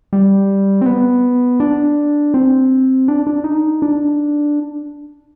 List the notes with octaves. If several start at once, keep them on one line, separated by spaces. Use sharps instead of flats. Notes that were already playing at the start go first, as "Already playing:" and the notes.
G3
C4
B3
D4
C4
D4
D4
D#4
D4